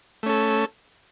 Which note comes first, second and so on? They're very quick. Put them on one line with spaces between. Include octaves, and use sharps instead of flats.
A3 C#4 A4